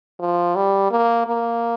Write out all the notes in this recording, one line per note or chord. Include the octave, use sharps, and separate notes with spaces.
F3
G3
A#3
A#3